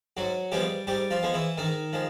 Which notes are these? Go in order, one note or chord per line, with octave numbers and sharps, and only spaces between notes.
G#2 F#3 F#4
F3 G3 G#3 B3 G4
G#2 G3 G4
F3 F4
F3 G#3 B3
E3 E4
G#2 D#3 D#4
F3 G#3